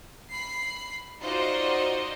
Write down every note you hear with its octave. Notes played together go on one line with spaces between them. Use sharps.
B5 C7
D#4 F4 F#4 C5 D5 D#5